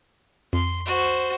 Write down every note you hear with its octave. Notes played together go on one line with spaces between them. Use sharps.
F2 C6
F#4 C5